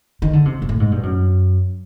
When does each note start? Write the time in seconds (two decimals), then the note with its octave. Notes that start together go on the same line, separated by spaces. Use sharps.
0.22 D#3
0.33 D3
0.45 C3
0.62 A#2
0.69 A2
0.80 G#2
0.92 G2
1.03 F#2